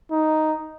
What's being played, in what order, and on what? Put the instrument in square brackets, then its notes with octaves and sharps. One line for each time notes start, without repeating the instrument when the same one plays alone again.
[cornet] D#4